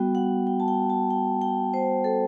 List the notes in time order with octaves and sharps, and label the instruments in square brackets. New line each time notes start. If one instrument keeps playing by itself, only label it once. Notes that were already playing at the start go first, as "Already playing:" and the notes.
Already playing: [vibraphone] G3 B3 F#4 G5
F#5
G5
A5
G5
A5
G5
G5
C5
A4